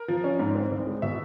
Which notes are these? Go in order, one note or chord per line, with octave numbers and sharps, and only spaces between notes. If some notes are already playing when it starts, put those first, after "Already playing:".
Already playing: A#4
F3
C#4
G#2
C4
C2
G#3
B2 E5